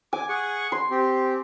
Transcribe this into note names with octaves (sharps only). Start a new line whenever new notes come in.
G#5 D6
G#4 F#5 C#6
C6
C4 G4